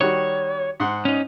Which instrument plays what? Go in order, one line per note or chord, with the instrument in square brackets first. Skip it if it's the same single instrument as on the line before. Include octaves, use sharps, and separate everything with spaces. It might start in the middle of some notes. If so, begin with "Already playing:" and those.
[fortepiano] D#3 G3 F#4 [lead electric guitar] C#5
[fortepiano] G#2 F#5 C6
[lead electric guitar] C#4 D#4